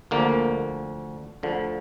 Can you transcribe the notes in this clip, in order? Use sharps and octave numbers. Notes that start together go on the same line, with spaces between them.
D2 D3 F3 A#3
D2 D3 F3